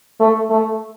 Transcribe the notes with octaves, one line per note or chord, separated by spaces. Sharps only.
A3
A3